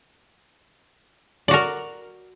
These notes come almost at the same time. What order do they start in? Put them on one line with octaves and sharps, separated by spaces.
D5 F#4 A#4